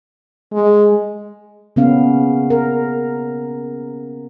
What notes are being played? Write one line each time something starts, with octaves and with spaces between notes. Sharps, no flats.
G#3
C#3 A#3 B3 C#4 F5
A#4